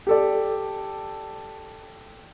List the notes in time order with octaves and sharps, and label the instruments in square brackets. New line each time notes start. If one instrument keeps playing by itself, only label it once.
[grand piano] G4 A4 D5